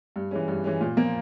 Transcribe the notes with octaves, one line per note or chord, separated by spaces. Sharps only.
G2
E3 G#3 C#4
G2
E3 G#3 C#4
A#2
F3 A#3